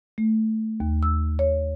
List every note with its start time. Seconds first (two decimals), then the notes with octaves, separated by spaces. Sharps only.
0.18 A3
0.80 D#2
1.03 E6
1.39 C#5